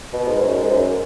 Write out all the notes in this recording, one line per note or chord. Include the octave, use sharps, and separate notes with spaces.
B2
G#2
F#2
G#2
F#2